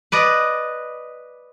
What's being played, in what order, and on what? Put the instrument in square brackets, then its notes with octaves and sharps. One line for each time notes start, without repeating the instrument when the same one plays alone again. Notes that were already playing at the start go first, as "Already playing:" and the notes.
[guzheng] B4 D5 D#5